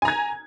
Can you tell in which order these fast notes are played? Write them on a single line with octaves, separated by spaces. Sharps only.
G#5 A#5 G#6